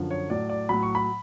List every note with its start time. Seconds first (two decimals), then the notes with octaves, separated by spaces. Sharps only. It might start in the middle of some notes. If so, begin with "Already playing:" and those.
Already playing: F#2 D3 F3
0.11 C#5
0.30 A2 F#3 D5
0.50 D5
0.69 A2 F#3 B5
0.83 C#6
0.95 B5